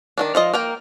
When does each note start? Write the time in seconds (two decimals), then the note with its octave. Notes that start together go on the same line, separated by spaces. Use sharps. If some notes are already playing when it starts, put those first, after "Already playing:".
0.18 D#3 F#3 D4
0.35 F3 F4 D#5
0.54 A#3 A#4 G5